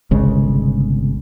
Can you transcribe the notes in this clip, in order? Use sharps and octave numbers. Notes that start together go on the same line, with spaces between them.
G1 C2 C#3 G#3